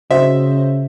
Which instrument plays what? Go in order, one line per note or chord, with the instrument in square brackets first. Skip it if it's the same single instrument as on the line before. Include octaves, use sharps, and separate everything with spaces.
[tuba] C#3 [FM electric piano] F#4 C5 D#5 [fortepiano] E5